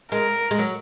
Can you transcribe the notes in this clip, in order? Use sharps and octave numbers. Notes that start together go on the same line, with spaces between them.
G#3 A#4
G#3
F#3